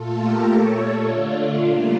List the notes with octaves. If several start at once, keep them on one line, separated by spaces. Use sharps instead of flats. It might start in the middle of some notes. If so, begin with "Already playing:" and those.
Already playing: A#2 A3 F4 A4
G4 A#4
A#2 A3 A4 C#5
D3 A3 D4 F4
C#3 G3 A#3 D4 F4